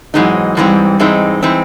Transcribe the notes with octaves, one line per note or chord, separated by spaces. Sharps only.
G#2 E3 F#3 G#3 C4 D#4
G#2 E3 G3 G#3 C4 D#4
G#2 E3 G#3 C4 D#4
E3 G#3 C4 D#4